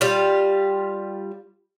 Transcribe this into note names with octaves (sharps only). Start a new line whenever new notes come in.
G3 F4